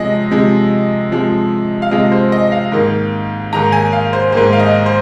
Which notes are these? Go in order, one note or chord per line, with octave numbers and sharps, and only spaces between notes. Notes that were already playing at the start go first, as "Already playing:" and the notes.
Already playing: C3 F3 G#3 D#5
C3 F3 G#3
C3 F3 G#3
F5
C3 F3 G#3 D#5
C5
D#5
F5
G#2 D#3 A#3
G#2 D#3 A#3 A#5
G#5
F5
C5
G#2 D#3 A#3 C5
F5
D#5
C5